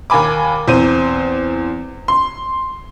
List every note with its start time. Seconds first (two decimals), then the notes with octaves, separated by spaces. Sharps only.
0.10 D#2 A#4 G#5 B5 D6
0.68 E2 C4 C5 D#7
2.08 C6